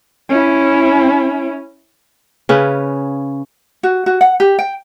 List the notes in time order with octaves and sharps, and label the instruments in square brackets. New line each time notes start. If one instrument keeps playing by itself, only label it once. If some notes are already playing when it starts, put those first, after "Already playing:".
[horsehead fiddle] C#4 E4
[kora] C#3 C#4 B4
[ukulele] F#4
F#4
F#5
G4
G5